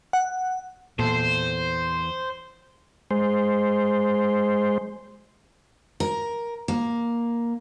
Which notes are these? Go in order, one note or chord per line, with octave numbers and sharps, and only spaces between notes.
F#5
E2 A#2 A4 C5
G#3 C5
A#4
A#3